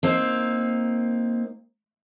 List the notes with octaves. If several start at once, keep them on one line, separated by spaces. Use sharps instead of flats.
A#3 C4 D#4